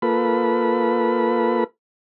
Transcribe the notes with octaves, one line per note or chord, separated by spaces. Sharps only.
A#3 F4 A4 B4 B5